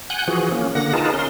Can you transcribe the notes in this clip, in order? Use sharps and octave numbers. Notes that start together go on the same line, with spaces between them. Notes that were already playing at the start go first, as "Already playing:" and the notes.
F#5 G#5 F#6 G6
E3 F3 F#4 G#4
A#3 C#4
D3 A#3 F#5 A#6
D#4 F4 G#4 A#4 B4 A5
C#4 A#4 C6